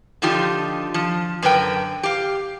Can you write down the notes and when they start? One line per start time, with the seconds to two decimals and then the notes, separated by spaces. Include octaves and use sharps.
0.22 D3 F3 D#4 F4 G4
0.94 F3
1.42 F#2 D3 A#4 B4 G5
2.03 G4 F5